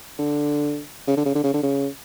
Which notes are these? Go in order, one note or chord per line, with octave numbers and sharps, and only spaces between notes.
D3
C#3
D3
C#3
D3
C#3
D3
C#3